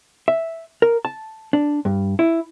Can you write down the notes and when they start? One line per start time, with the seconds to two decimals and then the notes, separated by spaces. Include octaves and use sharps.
0.28 E5
0.82 A#4
1.05 A5
1.53 D4
1.85 G2
2.19 E4